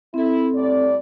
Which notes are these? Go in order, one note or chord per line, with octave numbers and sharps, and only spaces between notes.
C4 E4 A4
A2 G3 D5